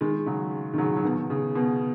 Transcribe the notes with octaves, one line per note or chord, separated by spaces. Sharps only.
D#3 G#3
C#3 F#3
D#3
C#3 F#3
F#3
B2 D#3
C#3
B2